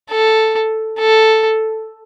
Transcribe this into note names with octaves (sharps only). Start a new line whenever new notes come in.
A4
A4